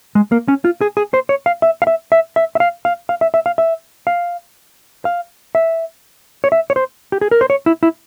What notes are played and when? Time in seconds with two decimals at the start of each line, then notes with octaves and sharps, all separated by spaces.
0.15 G#3
0.32 A#3
0.48 C#4
0.65 F4
0.81 G#4
0.97 G#4
1.14 C5
1.29 C#5
1.46 F5
1.62 E5
1.82 F5
1.87 E5
2.12 E5
2.36 E5
2.55 E5
2.60 F5
2.85 F5
3.09 F5
3.21 E5
3.34 E5
3.46 F5
3.58 E5
4.07 F5
5.05 F5
5.55 E5
6.44 C#5
6.52 E5
6.70 C#5
6.76 C5
7.12 G4
7.21 G#4
7.31 A#4
7.41 C5
7.50 C#5
7.66 E4
7.83 E4